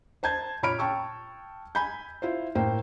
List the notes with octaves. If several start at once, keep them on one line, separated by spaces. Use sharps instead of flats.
C5 A5 G6 G#6
A#2 C#5 B5 F6 D7
G5 A5 C#6 E6
G#5 B5 G6
E4 F4 C5
A2 A#3 C5 G5